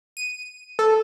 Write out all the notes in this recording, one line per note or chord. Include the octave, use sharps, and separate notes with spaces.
D#7
A4